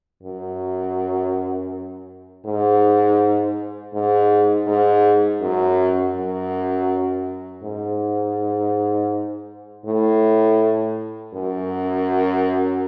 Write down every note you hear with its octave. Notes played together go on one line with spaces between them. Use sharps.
F#2
G#2
G#2
G#2
F#2
F#2
G#2
A2
F#2